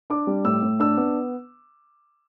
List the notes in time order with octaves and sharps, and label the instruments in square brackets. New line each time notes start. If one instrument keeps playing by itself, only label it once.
[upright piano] D4 D6
G3
A2 E6
A2
D4 E6
B3